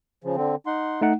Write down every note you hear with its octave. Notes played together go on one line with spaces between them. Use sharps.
C#3 F3
D3 C4
D#4 F#5 C6
A3 D#4 F#5